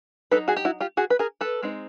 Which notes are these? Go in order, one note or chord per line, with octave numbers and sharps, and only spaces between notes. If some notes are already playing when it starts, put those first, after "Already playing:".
F#3 B3 D#4 A4 B4
F#4 G#4
G4
E4 F#4
F4 G4
F#4 G#4
B4
G#4 A#4
A4 B4
G#3 C4 D#4